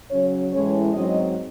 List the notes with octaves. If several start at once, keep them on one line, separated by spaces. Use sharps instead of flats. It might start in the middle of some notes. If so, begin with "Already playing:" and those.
C#3 F#3 C#4 C#5
A2 E3 G#3 C#4 C#5
G#2 F#3 C4 D#5